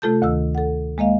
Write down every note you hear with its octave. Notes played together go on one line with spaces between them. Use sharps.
C3 A3 F4 A4 A5 G6
D2 D#3 E6
A4 F#5
G#3 A#3 D#5 F5